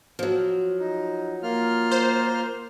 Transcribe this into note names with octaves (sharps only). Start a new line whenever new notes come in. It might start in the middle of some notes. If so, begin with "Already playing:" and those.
F3 F#3
D#4
A#3 F4 F6
C5